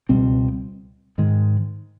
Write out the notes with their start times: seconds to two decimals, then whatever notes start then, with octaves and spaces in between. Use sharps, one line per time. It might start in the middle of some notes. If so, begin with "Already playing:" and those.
0.09 C#2 B2 G3 C4
1.18 G#2 D#3 G#3